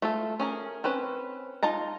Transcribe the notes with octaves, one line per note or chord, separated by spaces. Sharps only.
A3 F4 A4
C#4 G#4 A#4
C4 C#4 B4
D#4 F4 A5 A#5